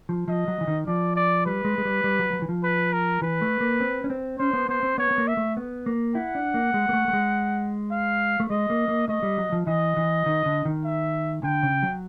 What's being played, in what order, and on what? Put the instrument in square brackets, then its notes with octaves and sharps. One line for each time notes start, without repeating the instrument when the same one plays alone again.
[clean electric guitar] F3
[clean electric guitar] F3 [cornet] D#5
[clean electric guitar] F#3
E3
D#3
[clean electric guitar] F3 [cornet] D5
[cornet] D5
[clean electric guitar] G3 [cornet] B4
[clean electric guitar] G#3
G#3
G3
G3
F#3
F#3
E3
F3
[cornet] B4
A#4
[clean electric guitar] E3 [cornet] B4
[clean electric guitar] A3
A#3
C4
C#4
C4
[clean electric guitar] C#4 [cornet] C5
[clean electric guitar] B3
[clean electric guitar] B3 [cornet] C5
[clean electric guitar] C4
[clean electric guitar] B3 [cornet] C#5
[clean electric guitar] B3
A#3
[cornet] E5
[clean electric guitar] A3
B3
A#3
[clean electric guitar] E4 [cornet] F#5
[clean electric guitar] D4
A#3
G#3
A#3
A3
A3
G#3
[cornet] F5
[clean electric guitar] A3
[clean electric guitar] G#3 [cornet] D#5
[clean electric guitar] A#3
A#3
[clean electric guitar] A3 [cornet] D#5
[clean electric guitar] G3
F#3
F3
[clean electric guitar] E3 [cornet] D#5
[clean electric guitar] E3
D#3
D3
D#3
[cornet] E5
[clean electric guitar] D3 [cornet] G5
[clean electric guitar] C#3
F#3